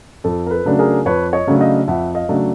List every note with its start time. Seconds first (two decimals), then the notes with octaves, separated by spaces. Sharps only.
0.24 F2 A4
0.47 A#4
0.51 A4 B4
0.65 C#3 F#3 A3 D4
0.79 G#4 A#4
1.05 F2 B4 C#5
1.33 C#5 D#5
1.47 C#3 F#3 A3 D4
1.61 D#5 F5
1.88 F2 E5 F#5
2.15 D#5 F5
2.29 C#3 F#3 A3 D4